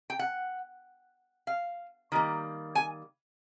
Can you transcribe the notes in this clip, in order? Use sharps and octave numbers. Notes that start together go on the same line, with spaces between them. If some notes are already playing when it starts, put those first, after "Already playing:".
G5
F#5
F5
D#3 G3 A#3
G#5